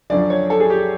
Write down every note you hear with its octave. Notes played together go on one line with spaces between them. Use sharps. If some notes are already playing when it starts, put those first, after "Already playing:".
F#2 D3 F3 D5
C#5
A4
G#4
G4